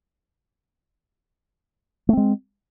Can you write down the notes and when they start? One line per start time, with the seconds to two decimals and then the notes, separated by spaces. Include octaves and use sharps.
2.09 A3
2.13 C4
2.17 G#3